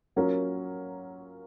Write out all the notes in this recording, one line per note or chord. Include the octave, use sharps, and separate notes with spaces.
F#3 A#3 C#4 F4 A#4